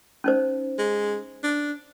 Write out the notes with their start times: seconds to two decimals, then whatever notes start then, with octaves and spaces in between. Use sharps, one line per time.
0.24 C#4 D#4 C5
0.78 G#3
1.43 D4